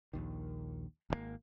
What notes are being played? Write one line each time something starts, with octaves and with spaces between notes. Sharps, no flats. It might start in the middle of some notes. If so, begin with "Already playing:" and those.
A#1 D#2 D#3
G#1 C#3 A#3